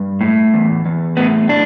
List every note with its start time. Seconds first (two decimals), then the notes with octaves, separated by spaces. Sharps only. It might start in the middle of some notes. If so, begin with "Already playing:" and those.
Already playing: G2
0.21 A2
0.54 E2
0.86 E2
1.17 A2 B3
1.49 A2 D4